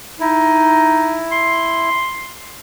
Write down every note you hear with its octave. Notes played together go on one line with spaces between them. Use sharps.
D#4 E4
C6